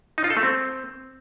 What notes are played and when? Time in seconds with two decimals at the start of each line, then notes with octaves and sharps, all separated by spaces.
0.18 D#4
0.24 F4
0.30 A4
0.37 A3
0.43 C4